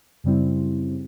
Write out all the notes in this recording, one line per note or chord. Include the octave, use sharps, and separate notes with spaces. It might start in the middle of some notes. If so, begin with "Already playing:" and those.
F#2 C#3 G3 C4 E4